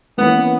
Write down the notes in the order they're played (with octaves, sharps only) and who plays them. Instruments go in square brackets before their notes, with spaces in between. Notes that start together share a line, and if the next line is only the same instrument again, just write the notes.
[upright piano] E3 A#3 C#4 [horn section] B3